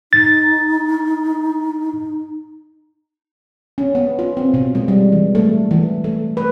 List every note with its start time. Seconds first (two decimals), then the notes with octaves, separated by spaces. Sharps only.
0.13 D#4 A6
3.78 C#4
3.95 B3
4.19 F4
4.37 C4
4.54 B2
4.75 G#3
4.88 G3
5.12 E3
5.35 A3
5.71 E3
6.04 A3
6.37 B4